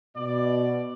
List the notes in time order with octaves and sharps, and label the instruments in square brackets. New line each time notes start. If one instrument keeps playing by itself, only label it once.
[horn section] B2 D5